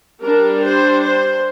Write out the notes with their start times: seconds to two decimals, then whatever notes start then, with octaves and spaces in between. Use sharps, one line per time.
0.22 G3 D4 A#4
0.63 C5
1.04 C5